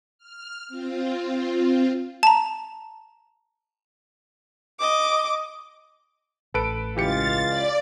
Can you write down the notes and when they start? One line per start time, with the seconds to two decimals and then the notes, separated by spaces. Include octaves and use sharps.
0.18 F6
0.68 C4 F4
2.23 A5 A#5
4.80 D#5 D6
6.54 A1 A4 B4 D7
6.97 C#2 E3 F4 G4 F5 A6 C#7
7.49 D5